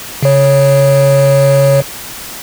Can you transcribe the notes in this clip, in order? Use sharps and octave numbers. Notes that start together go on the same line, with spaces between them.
C#3 C#5